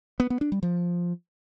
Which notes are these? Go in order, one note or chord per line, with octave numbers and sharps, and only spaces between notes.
B3
B3
D4
G3
F3